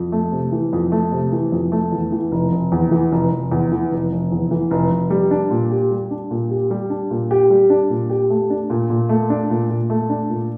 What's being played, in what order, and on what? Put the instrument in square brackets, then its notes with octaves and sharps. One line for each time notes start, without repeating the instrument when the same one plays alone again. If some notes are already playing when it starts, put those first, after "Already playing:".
Already playing: [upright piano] F2
A3
C3
E3
F2
A3
C3
E3
F2
A3
E2
E3
F1
F1
E2
E3
F1
F1
E2
E3
F1
F1
E2
E3
F1
F1
G3
D4
A#2
G4
G3
D4
A#2
G4
G3
D4
A#2
G4
G3
D4
A#2
G4
A3
D4
A#2
A#2
A3
D4
A#2
A#2
A3
D4
A#2